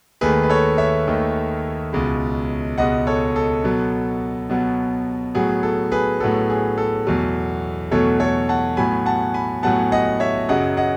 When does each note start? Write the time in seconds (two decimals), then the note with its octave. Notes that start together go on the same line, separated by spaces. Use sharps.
0.21 D#2 D#3 A3 G#4 B4
0.43 B4
0.49 A4 C#5
0.78 C#5 E5
1.07 D#2 D#3 A3
1.93 C#2 B2 G#3
2.78 C#2 B2 G#3 D#5 F#5
3.07 A4 C#5
3.36 A4
3.64 B2 F#3 B3
4.50 B2 F#3 B3
5.35 A2 F#3 B3 G#4
5.63 A4
5.92 G#4 B4
6.20 A2 F#3 B3 A4
6.50 G#4
6.78 A4
7.07 E2 B2 F#3 A3
7.91 E2 B2 F#3 A3 A4 C#5
8.20 A4 C#5
8.49 F#5 A5
8.77 A2 F#3 B3 G#5 B5
9.06 F#5 A5
9.34 G#5 B5
9.63 A2 F#3 B3 F#5 A5
9.92 D#5 F#5
10.20 C#5 E5
10.49 F#2 C#3 F#3 D#5 F#5
10.77 D#5 F#5